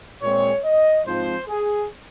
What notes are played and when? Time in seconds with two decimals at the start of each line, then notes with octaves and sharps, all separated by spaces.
0.22 A#2 G#3 C4 C#5
0.64 D#5
1.06 G#2 F3 C4 C5
1.48 G#4